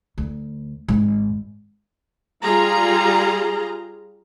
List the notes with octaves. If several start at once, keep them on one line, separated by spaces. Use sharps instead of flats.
D2
G#1 G#2
G3 F4 G#4 A#5